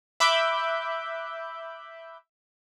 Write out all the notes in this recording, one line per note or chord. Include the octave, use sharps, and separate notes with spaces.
E5 B5 D6 F#6 G6